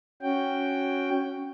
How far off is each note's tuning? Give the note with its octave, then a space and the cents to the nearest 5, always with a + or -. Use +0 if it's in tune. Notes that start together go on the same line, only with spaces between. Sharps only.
C#4 +0 F#4 +0 G5 +0